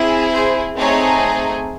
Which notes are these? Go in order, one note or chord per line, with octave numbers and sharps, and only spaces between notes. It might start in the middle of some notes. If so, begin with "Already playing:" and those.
Already playing: C4 E4 G#4
C5
A3 C4 D#4 G#4 C#5